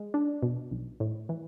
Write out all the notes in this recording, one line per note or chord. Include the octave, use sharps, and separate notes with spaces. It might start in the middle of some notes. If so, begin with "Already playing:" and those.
Already playing: G#3
D4
B2
B1
A2
E3